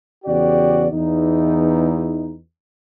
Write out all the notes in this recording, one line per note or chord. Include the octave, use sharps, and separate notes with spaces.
E2 C#3 F#4 G4 D5
E2 D#4